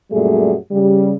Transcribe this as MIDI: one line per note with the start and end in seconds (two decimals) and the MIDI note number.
0.11 0.54 42
0.11 0.54 46
0.11 0.54 55
0.11 0.54 57
0.11 0.54 68
0.71 1.12 49
0.71 1.12 55